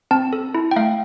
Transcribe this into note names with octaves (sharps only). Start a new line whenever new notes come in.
C4 A5
A4
E4
G5
A3 F5